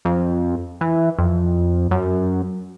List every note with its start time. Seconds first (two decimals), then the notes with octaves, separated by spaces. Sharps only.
0.05 F2
0.81 E3
1.19 F2
1.91 F#2